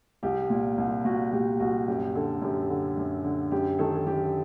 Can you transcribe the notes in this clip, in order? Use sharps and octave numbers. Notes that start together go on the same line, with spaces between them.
C2 G4
A#2
C2
A#2 F#4
A#2 G4
C2 F#4
F#2 G4
D3 A4
F#2 G4
D3
F#2
D3
F#2 G4
D#3 A4
A4
F#2 G4